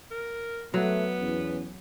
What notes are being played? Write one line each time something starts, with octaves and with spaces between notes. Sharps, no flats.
A#4
F#3 A3 B3
E2 C#4